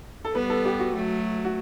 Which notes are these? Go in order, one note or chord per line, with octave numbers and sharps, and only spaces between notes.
A4
G3 B3 B4
A4
G4
F#4
F#3 A3
F#4